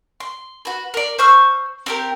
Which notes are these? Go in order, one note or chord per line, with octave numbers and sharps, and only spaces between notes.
C6
F#4 B4
A#4 D5
C5 C#6 E6 F6
C4 G4 A#4